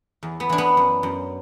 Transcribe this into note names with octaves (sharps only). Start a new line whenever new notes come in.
E2
B3
E3 D4
B3
F#2
F#2